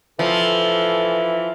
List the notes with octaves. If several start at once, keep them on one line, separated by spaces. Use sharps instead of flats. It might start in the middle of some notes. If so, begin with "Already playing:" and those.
E3 F3 A4